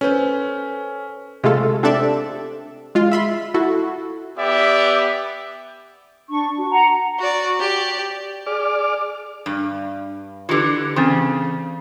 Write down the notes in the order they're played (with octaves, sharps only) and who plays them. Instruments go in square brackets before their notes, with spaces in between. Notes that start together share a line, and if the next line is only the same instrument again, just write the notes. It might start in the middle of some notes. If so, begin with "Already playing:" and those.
[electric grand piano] C#4 [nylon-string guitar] A4 B4 C5
[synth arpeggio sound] C3 G#3 A3 F4 A4
C4 D4 G4 A4 D5 E5
G#3 F4
E5 B5 C6
E4 F#4 A4
[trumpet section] B3 G4 D5 E5
[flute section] D4 C#6
F#4
F#5 A#5
[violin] F#4 D5
G4 D5
[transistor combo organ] G#4 D5 D6 F6
[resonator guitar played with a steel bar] G2
[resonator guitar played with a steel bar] D3 E3 [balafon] F4 G4 B4
[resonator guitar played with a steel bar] C#3 [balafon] E3 C4 C#4